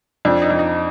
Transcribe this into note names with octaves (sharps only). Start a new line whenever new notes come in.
F2 D4
D#4
F2
D#4